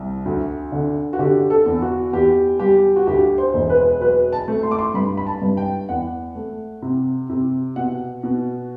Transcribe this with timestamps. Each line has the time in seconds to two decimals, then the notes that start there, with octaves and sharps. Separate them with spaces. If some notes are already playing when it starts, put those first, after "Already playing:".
Already playing: C2
0.25 D2
0.72 D3
1.13 F#4
1.19 D3 G4
1.50 A4
1.66 E2
1.82 F#4
2.13 E2 G4
2.59 G3 G4
2.96 F#4
3.07 D2 G4
3.38 C5
3.54 E1
3.70 B4
4.01 F#3 B4
4.33 A5
4.48 A3
4.63 C6
4.71 D6
4.79 C6
4.94 G2 B5
5.17 B5
5.27 A5
5.42 G2
5.57 G5
5.89 E2 F#5
6.35 A3
6.82 C3
7.30 C3
7.76 B2 F#5
8.23 B2